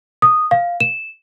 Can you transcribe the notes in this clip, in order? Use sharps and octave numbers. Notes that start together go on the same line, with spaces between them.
D#6
F5
E7